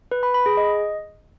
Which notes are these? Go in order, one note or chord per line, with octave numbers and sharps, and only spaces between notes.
B4
B5
B5
G#4
D#5